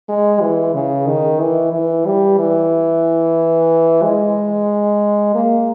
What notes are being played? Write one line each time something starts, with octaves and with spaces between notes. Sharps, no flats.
G#3
E3
C#3
D#3
E3
E3
G3
E3
G#3
A#3